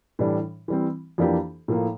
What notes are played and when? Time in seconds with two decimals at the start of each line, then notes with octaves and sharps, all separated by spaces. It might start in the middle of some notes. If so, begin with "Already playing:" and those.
0.19 A2 E3 G3 D4
0.68 E3 G3 C4
1.18 F2 E3 A#3 D4 G4
1.68 A2 F3 A#3